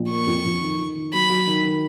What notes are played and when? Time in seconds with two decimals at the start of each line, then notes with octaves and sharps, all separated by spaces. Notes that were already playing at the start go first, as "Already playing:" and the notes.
Already playing: A#1
0.10 A#3 C#6
0.27 F2
0.45 F2
0.61 D#3
0.79 D#3
0.96 D#3
1.13 F#3 B5
1.29 F#3
1.47 D#3
1.65 D#3